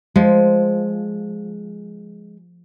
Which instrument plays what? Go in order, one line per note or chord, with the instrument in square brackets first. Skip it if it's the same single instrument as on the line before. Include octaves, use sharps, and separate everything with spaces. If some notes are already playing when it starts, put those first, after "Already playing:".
[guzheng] F3 [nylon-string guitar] G#3